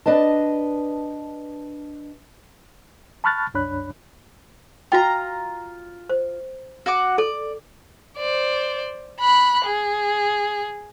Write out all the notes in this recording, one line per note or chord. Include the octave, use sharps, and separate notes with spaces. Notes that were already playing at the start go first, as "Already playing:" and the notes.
D4 B4 D#5 A5
A5 B5 C#6 F6 F#6 A6
C2 F#2 D4 C#5 B5 F#6
F4 F#4 G5 A#5
C5
F#4 F#5 D6
A4 D5
C5 D5
B5 F#6
G#4